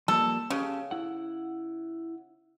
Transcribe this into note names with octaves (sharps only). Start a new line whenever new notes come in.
F3 G3 A#3 A4
C#3 C#4 G4 A4
E4 F#5